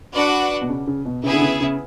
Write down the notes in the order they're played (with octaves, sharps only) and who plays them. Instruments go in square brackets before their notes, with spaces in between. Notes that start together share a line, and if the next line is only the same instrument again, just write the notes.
[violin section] D4 F#4 B4 D5 F#5
[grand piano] B2
C#3
C#3
B2
[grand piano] C#3 [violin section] B3 E4 G#4
[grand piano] D3
C#3
C#3